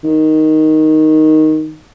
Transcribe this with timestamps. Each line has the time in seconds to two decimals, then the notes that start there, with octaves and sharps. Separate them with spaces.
0.04 D#3